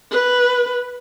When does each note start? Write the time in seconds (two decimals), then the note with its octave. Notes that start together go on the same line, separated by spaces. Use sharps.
0.11 B4